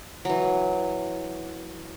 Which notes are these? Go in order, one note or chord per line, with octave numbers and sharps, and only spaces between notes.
E3 F#3